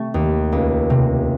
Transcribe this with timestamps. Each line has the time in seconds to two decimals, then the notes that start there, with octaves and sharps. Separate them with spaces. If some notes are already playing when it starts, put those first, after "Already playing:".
Already playing: C3 A3 A5 C#6
0.14 D#2
0.52 C#2
0.90 C3